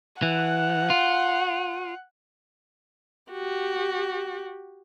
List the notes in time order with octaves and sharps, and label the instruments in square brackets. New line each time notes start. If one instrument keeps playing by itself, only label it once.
[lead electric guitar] E3 [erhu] F#5
[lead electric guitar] F4
[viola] F#4 G4